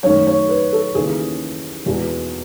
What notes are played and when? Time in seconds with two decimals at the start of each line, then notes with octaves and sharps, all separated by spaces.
0.03 F#2 D#3 A3 C#5
0.27 C#5
0.49 B4
0.73 A4
0.95 D#2 C#3 E3 G#4
1.86 E2 B2 G#3